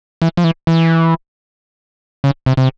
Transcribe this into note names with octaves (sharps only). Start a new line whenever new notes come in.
E3
F3
E3
E3
C#3
C3
C3